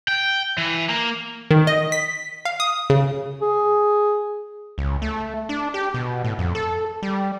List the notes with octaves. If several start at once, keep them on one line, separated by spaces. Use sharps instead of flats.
G5
E3
A#3
D#3
D#5
B6
F5
D#6
C#3
G#4
C#2
A3
D4
G4
B2
A2
F2
A4
G3